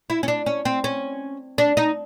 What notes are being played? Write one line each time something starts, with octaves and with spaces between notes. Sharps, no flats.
E4
C#4
D4
C#4
C4
C#4
D4
D#4